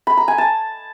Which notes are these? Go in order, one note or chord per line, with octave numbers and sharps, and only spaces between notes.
B5
A#5
G#5
A5